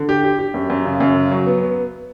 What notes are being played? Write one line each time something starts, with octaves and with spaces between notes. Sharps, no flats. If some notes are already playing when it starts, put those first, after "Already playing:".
Already playing: D3
G4
G4
G4
F#2
F#2
C#3
F#2
C#3
F#3
B3
B3